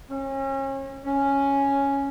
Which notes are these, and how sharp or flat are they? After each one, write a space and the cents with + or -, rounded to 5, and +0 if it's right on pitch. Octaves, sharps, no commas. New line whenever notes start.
C#4 -35
C#4 +0